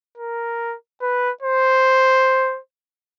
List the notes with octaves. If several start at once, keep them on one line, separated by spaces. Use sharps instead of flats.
A#4
B4
C5